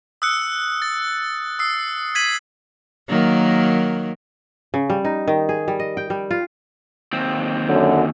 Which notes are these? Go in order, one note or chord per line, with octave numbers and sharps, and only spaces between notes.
D#6 E6 F#6 C#7
A6
D#6 E6 C7
G#6 B6 D#7 F#7
D#3 F#3 A#3
C#3
G3
D#4
D#3
G#4
G3
D#5
G5
G3
F4
D#2 C4
F#2 D3 F#3